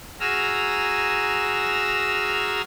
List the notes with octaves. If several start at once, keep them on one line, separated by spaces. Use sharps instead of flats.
F#4 G#4 G#5 A#5 E6 F6